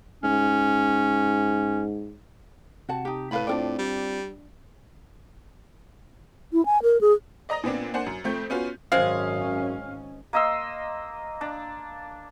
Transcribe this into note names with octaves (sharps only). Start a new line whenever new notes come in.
G#2 C#4
C3 F#4 F#5 A5
D#4 G4
A2 B4 F5 B5
C4 D4 F4 A#4 D5 G5
G3
E4
G#5
A#4
G#4
D5 D#5 A#5 D#6 A#6
A#2 B3 C4 D4
A#3 D4 C5 F#5 G#5 C#7
F#2
F2 A3 C4 G6
B3 C#4 F4 F#4
G#1 F#2 G#3 C4 C#4 G#4 F5
A#3 D#5 C6 E6
D4